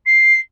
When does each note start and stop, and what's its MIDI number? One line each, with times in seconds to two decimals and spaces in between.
0.05 0.39 96